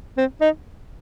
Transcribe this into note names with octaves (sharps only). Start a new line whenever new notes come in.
C4
D#4